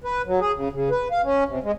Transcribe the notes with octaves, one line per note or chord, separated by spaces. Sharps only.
B4
F#3
G#4
C#3
C#3
B4
F5
C#4
C3
G#3